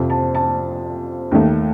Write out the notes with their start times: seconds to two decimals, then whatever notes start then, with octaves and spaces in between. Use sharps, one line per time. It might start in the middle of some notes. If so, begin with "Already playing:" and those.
Already playing: F2 C3 F3
0.10 A5
0.35 A5
1.31 D#2 D#3 A3